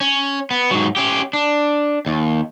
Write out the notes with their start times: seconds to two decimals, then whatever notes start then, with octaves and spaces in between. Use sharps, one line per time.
0.01 C#4
0.51 B3
0.71 G#2 F#3
0.96 C#4 G4
1.33 D4
2.06 D#2